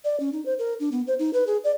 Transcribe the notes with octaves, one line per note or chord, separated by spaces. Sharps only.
D5
C#4
D#4
C5
A#4
D4
B3
C5
D#4
B4
G#4
D5